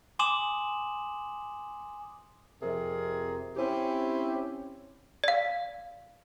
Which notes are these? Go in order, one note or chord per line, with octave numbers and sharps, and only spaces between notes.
G#5 C6 D6 D#6 E7 F#7
F2 C3 G#4 A#4
C4 C#4 E4 G4 C5
D5 F5